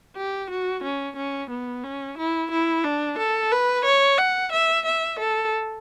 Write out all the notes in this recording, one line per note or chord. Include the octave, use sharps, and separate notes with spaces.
G4
F#4
C#4
C#4
B3
C#4
E4
E4
D4
A4
B4
C#5
F#5
E5
E5
A4